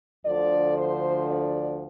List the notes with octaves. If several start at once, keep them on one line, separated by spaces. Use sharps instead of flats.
D2 D3 F3 D5
C5
D5